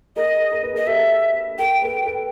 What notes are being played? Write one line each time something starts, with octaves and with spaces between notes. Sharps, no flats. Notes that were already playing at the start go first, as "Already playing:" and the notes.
G#4 A#4 D#5
A#4
B4
G#4 A#4 D#5
G4 A4 E5
G#4 A#4 G5
A4 B4
A4 B4